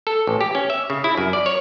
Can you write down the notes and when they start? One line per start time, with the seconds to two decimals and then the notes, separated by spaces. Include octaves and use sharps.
0.07 A4
0.27 A1
0.41 G4
0.55 C#4
0.70 E5
0.90 C#3
1.04 E4
1.17 F#2
1.33 D5
1.46 C#5